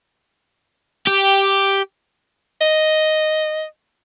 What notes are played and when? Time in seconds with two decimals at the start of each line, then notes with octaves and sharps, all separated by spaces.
1.07 G4
2.61 D#5